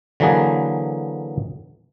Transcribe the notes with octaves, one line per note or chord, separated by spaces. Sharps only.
D3 E3 F#3 A#3 G#4 B4